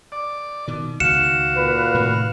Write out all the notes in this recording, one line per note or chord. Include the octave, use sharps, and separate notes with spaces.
D5
B2 D#3
C#2 D#3 F#4 F5 C#7 E7
A#2 B4
A2 C3 D#3